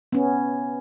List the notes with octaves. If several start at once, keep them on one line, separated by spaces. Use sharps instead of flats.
B3 C#4